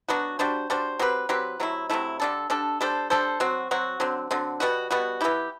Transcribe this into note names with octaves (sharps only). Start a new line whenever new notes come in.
F#3 B3 D4 F#4
G3 D4 F#4 C5
G3 D4 F#4 C5
F#3 C4 G4 B4
F#3 C4 G4 B4
C3 F#3 A3 E4
C3 F#3 A3 E4
D3 G3 D4 A4
D3 G3 D4 A4
G3 D4 A4 C5
G3 D4 A4 C5
F#3 C4 F#4
F#3 C4 F#4
D3 F#3 C4
D3 F#3 C4
B2 G3 B3 F#4
B2 G3 B3 F#4
E3 B3 E4 G4